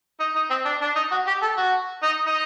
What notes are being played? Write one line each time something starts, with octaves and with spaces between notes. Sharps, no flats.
D#4
D#4
C4
D4
D4
D#4
F#4
G4
A4
F#4
D#4
D#4